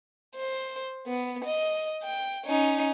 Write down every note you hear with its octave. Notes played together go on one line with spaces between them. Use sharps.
C5
B3
D#5
G5
C#4 D#4